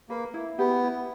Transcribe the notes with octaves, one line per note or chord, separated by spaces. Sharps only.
A#3 B4
E4
B3 G4
E4